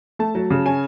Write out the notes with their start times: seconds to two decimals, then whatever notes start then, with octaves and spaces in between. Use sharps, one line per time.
0.19 A3 A5
0.35 F#3
0.50 C#3
0.66 C#4 G#5